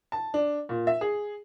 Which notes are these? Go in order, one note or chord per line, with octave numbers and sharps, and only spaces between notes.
A5
D4
A#2
E5
G#4